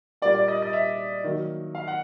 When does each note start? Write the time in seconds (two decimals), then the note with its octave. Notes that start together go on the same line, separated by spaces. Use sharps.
0.22 A#2 G3 A#3 D5
0.35 D5
0.48 D#5
0.62 D#5
0.73 E5
1.24 D#3 F#3 A#3
1.75 F5
1.87 F#5